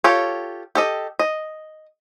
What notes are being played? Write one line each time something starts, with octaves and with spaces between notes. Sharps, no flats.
F4 G4 A4 C#5
G4 A4 D#5
D#5